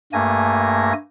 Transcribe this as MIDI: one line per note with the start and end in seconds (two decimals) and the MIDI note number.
0.13 0.93 43
0.13 0.93 57
0.13 0.93 58
0.13 0.93 80
0.13 0.93 94